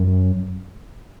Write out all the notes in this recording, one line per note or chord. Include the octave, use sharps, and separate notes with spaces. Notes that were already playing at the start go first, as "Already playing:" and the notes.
Already playing: F#2